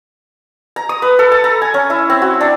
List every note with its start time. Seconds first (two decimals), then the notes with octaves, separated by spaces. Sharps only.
0.76 A#5
0.89 D#6
1.02 B4
1.19 A4
1.32 A5
1.44 A#5
1.62 G#5
1.74 C#4
1.90 E4
2.10 C4
2.22 F#4
2.41 D4